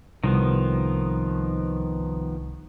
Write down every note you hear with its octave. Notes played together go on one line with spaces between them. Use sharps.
C2 D#3 F3 B3